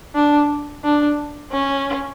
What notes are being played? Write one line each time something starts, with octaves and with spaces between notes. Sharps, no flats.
D4
D4
C#4